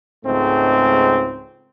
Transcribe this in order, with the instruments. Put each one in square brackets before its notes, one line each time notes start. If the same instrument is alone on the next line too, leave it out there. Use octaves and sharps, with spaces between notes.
[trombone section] C#2 G#2 A3 C4